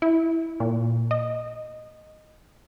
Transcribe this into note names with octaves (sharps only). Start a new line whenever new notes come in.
E4
A#2
D#5